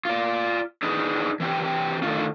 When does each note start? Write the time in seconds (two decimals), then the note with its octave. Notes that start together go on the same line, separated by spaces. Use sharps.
0.05 F4 D5
0.83 D4 D#4 G#4 B4
1.40 E3 C4 G4
2.02 D3 D#3 A3 D4 D#4 F4